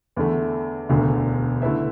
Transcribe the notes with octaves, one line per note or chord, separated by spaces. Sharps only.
E2 D3 A3
E1 D2 D3
D3 A3 E4 B4 E5